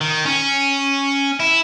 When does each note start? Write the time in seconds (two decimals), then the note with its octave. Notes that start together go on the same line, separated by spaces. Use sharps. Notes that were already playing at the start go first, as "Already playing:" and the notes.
0.01 D#3
0.25 C#4
1.40 E4